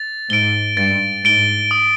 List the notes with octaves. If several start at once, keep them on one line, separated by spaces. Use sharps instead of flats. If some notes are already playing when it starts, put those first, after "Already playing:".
Already playing: A6
G#2 D7 G7
G2 A6
G#2 D7 G7
D#6